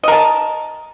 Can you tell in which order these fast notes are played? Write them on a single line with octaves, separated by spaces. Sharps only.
D#5 A#4 A5